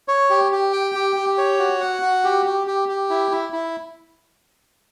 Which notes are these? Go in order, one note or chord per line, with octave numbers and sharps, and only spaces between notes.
C#5
G4
G4
G5
G4
G4
C#5
F#4
F#5
F#4
G4
G4
G4
G4
E4
E4
E4